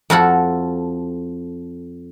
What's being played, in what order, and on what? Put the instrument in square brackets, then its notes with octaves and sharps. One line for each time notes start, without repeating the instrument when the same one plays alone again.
[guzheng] F2 F#4 A4 F#5